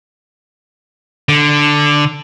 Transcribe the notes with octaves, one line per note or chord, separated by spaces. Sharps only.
D3